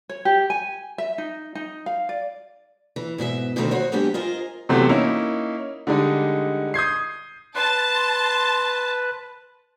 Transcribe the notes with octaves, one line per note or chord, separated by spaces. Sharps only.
C#5
G4
G#5
E5
D#4
D#4
F5
D5
E3
G#2 B2 F#4 E5
D2 B2 D3 D#3 A3 C4
F#4 C5 C#5
F#3 G#3 B3 D4 G4
F4 G#4 A#4 C5 D#5 F5
C3 E3 F#3 A3 B3 C4
A#3 C#4 D#4 E4
D3 G3 G#3 D#4
D#6 G6 G#6 C7
B4 A5 C6